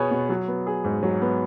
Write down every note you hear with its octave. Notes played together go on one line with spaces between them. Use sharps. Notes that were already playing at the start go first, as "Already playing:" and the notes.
Already playing: B2 B3 G#4 C#5
B2
F#3
B3
G#4
G#2
F#3
B3